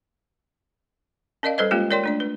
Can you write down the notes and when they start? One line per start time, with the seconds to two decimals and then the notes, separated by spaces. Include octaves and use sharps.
1.43 C#4 A#4 D5 D#5 F5
1.58 G3 A4 B4 C5 D#5
1.71 G#3 A#3 C#4 F4 G4
1.91 A#4 C#5 D5 G5 C6
2.04 A3 D4 D5
2.20 B4